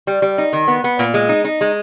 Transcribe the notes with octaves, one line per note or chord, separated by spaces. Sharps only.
G3
G3
D#4
D#3
B3
B3
A#2
G#3
D#4
D#4
G#3